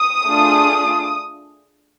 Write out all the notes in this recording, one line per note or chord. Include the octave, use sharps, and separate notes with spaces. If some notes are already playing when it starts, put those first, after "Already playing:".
Already playing: D#6
A3 D4 F4 G#4